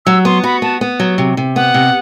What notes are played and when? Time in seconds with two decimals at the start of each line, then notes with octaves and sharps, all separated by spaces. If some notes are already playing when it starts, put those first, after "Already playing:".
0.06 F#3 E6
0.25 B3 C6
0.44 F#4 B5
0.62 B3 A5
0.81 B3
0.99 F#3
1.18 C3
1.37 C3
1.56 B3 F#5
1.74 C3